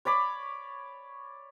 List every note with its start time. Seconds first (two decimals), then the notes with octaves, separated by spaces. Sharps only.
0.05 C#5 D5 B5 D6